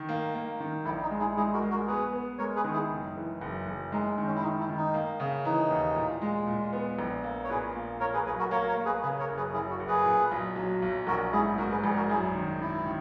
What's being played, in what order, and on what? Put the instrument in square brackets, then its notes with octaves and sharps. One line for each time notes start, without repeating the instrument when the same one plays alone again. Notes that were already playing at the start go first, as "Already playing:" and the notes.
Already playing: [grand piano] D#3
A#3
A#3
D#3
[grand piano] A#1 [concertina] E4
[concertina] D#4
[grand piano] G#3
[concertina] E4 G#4
[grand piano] G#3 [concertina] E4 G#4
[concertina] F#4 A#4
[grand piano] G#3
[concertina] F#4 A#4
[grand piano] B3 [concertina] G#4 B4
[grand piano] B3
[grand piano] G#3 [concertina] A#4 C#5
[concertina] G#4 B4
[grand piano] D#3
[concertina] E4 G#4
[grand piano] F#1
E3
F#1
F#1
[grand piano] G#3 [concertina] D#4
[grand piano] D#3
[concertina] C#4
E4
[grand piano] D#3 [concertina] D#4
[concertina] E4
[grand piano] D#3
[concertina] D#4
[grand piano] A#3
C#3
[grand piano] E3 [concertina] D#4
[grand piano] D#2
A#2
G#3
A#2
B3
A#1
A#3
[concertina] C#5
[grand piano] A#2 [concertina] G#4 B4
[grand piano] A#3
[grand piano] A#3 [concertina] A#4 C#5
[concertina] G#4 B4
[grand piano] B1 [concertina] G#4 B4
[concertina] F#4 A#4
[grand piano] A#3 [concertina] A#4 C#5
[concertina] A#4 C#5
[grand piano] A#3
[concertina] G#4 B4
[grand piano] C#3 [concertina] G#4 B4
[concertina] A#4 C#5
[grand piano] F#1
[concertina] G#4 B4
[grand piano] F#1 [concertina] E4 G#4
[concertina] F#4
[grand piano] F#1
[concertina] G#4 B4
[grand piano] A#2
B1
F#3
B1
[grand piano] A#1 [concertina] F#4 A#4
[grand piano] G#2 [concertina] E4 G#4
[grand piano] G#2 [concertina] F#4 A#4
[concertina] G#4 B4
[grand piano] A#1 [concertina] G#4 B4
[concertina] F#4 A#4
[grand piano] F#2 [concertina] E4 G#4
[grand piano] D#3
[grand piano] D#3 [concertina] E4
[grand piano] D#3